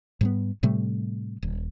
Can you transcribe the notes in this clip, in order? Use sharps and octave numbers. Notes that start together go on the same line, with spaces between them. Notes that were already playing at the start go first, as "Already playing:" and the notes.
G#2 G3 B3
A2 C3 G3 A3
D#1